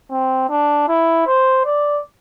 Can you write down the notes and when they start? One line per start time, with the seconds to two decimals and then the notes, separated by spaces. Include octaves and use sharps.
0.11 C4
0.50 D4
0.88 E4
1.27 C5
1.66 D5